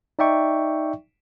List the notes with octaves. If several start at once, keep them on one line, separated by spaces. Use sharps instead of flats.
D#4 D5 E5 G5 C#6